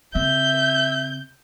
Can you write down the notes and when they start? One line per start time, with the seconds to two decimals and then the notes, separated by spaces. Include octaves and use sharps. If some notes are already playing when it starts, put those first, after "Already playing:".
0.15 C#3 C4 E5 G6